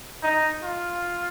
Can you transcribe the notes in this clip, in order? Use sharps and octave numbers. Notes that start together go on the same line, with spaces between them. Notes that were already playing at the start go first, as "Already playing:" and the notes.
D#4
F4